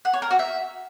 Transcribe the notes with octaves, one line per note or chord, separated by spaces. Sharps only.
F#5
C#5
A#4
F#4
E5